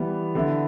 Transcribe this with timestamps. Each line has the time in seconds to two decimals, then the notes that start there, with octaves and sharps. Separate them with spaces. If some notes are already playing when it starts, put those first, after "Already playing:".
Already playing: E3 G3 B3
0.35 D3 B3 E4